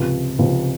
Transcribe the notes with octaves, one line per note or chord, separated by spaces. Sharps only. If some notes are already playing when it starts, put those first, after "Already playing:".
Already playing: C#2 C3 F3
C#2 C3 F3